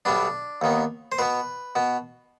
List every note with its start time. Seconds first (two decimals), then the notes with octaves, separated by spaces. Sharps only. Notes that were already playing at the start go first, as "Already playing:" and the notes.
0.05 B1 B2 G3 B3 D4
0.62 D#2 D#3 B3
1.12 C5
1.19 B2 B3 B4
1.76 B2 B3